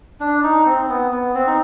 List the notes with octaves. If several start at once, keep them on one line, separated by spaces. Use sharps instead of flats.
D4
D#4
C4
B3
B3
C4
D#4